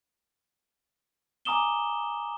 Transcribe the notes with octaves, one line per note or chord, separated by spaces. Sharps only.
G#5 A#5 D6 D#6 E7 G7